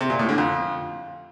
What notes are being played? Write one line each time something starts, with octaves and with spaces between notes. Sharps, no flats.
C3
A#2
A2
D3
F2